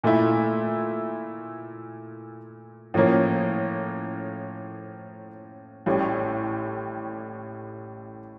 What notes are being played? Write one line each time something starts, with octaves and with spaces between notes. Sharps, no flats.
A#2 A3 E4
A2 F3 A#3 C#4
A1 A2 G3